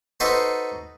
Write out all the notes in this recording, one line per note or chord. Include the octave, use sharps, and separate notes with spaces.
D#4 F#4 A4 B4 C5